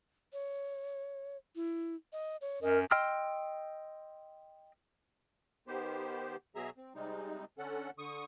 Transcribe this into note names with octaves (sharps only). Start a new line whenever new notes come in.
C#5
E4
D#5
C#5
F#2 A#4 D#5
D#5 G5 C6 E6 F6
D#3 B3 G4 C5
B2 F#3 G#4 E5 A#5
C4
C3 G3 G#3 D#4
D3 C#4 A4 F#5
D3 C#6 D#6